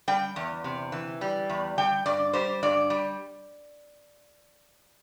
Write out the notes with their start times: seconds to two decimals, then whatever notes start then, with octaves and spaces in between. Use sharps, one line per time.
0.08 G3 G5
0.36 E2
0.64 C3
0.92 E3
1.21 G3
1.50 E2
1.78 G3 G5
2.06 G2 D5
2.33 G3 C5
2.63 G2 D5
2.90 G3